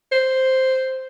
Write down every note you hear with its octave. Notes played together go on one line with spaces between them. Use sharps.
C5